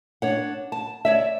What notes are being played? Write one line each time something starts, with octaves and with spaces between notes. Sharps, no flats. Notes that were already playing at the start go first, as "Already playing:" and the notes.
D4 C#5 F#5
A5
C#5 D5 E5